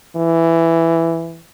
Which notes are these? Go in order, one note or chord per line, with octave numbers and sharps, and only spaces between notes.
E3